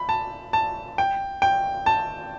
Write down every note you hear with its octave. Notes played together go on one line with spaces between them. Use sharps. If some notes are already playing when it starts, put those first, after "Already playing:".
Already playing: B5
A5
A5
G5
G5
A5